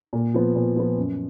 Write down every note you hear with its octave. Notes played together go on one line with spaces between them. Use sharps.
A#2
F3 B3
A#2
F3 B3
F#2